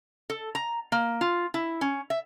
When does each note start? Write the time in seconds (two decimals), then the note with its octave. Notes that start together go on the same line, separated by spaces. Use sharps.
0.30 A4
0.55 A#5
0.92 A#3
1.21 F4
1.54 E4
1.81 C#4
2.10 E5